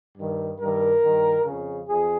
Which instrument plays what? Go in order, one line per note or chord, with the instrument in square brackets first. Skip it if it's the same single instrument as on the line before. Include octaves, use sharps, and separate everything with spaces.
[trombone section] G2 D#3
G2 D#3 A#4
G2 D#3
F2 C#3
F2 G#4